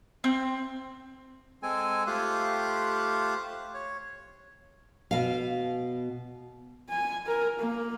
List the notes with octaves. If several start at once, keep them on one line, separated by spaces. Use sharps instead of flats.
C4
G#3 C4 A4 G#5
A3 F4 G4 C5 F5 F#6
C#5
B2 F5
G#5
A#4
A#3